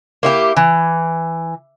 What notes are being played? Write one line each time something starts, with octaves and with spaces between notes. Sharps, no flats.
A#3 E4 G4
E3